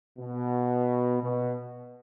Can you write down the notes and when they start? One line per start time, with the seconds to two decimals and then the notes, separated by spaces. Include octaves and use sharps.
0.19 B2
1.23 B2